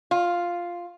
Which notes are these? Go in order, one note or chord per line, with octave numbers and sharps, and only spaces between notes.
F4